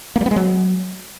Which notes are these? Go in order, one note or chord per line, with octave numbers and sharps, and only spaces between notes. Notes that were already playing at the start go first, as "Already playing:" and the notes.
A#3
G3
B3
G#3
F#3